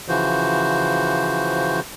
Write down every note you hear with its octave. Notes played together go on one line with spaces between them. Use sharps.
C#3 E3 F3 F#4 C5